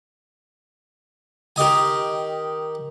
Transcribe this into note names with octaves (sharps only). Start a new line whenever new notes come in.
D#3 G4 D#5 G#5